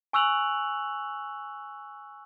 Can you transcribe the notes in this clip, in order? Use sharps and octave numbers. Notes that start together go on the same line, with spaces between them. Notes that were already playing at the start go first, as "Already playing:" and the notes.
G#5 C#6 E6 F#6 F7 F#7